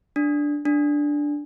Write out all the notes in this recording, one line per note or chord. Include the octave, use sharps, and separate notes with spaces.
D4
D4